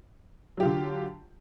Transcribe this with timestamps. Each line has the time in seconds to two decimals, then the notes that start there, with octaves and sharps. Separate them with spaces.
0.57 F#3
0.60 G4
0.63 F4
0.65 D3